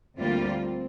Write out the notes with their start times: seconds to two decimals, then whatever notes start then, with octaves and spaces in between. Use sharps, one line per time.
0.17 D2 D3 G3 A#3 C4 F4